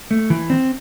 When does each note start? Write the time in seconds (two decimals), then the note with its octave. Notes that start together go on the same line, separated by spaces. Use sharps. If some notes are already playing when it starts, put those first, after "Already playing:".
0.11 A3
0.30 E3
0.50 C4